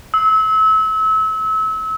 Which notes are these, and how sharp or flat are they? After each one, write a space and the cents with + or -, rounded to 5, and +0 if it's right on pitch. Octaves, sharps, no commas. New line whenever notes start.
E6 -30